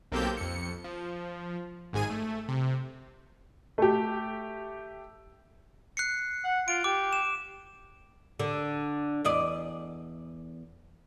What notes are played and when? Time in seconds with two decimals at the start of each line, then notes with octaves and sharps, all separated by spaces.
0.12 B1 A#3 C4 G4 A4 G6
0.37 F2 C#7
0.84 F3
1.93 G#1 G#2 G#4 G#5 D#7
2.10 A3
2.49 C3
3.78 A3 G4
5.97 F#6 C7 C#7
6.45 F#5
6.68 F4 D7
6.84 G4 D6
7.13 E7
8.40 D3
9.24 E2 D5 D#5